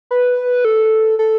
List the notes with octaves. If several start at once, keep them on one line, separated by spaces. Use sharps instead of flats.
B4
A4
A4